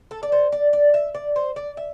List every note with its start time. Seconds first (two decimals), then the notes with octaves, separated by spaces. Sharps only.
0.11 A4
0.23 D5
0.32 C5
0.52 D5
0.73 D5
0.94 E5
1.15 D5
1.36 C5
1.56 D5
1.77 E5